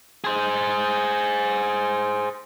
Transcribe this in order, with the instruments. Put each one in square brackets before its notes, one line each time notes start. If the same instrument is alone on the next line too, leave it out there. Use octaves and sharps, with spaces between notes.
[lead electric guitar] G#4 C5